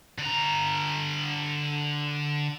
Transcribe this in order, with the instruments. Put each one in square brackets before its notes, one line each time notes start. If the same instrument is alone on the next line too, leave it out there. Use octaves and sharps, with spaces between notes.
[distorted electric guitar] D3 A#5